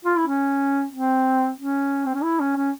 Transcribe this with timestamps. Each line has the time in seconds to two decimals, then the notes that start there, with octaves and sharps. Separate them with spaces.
0.05 F4
0.17 E4
0.27 C#4
0.92 C4
1.58 C#4
2.05 C4
2.15 C#4
2.23 E4
2.40 C#4
2.56 C#4